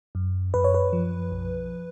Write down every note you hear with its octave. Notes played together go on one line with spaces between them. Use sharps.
F#2
F#2 B4
C#5
B4
F3
B1